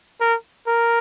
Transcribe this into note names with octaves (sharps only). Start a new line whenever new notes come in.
A#4
A#4